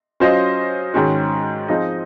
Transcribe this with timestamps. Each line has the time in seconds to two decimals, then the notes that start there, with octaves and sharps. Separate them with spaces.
0.20 F#3 C#4 F4 C5 D#5
0.94 G#2 D#3 G#3 C#4 F#4
1.68 F3 C4 D#4 G#4 D#5